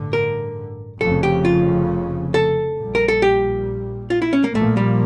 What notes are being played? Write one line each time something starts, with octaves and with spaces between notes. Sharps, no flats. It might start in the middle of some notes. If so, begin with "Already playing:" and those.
Already playing: A1 G2 D3
A#4
F1 F2 C#3 A4
G4
F4
A4
A#1 A#2 G3
A#4
A4
G4
F4
E4
C#4
A#3
A#1 A#2 F3 A3 A#3
G3